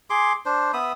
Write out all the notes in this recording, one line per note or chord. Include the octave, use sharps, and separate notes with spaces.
G#4 C6 D6
D4 C5
B3 E5 B5 D#6